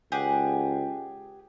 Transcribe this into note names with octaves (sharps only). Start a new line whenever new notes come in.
C#2 G4 G#4 F#5